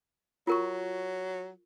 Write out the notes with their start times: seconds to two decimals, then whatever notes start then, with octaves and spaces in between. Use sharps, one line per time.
0.47 F#3 F4 A#4 C#6